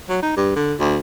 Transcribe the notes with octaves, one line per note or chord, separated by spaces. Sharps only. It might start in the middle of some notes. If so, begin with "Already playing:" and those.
F#3
D#4
G2
D3
D2